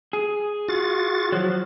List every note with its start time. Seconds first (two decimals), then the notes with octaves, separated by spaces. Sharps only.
0.13 G#4
0.68 F4 F#4 A6
1.32 F3 F#3